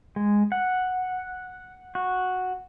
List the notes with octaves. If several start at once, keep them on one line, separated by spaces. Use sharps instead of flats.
G#3
F#5
F#4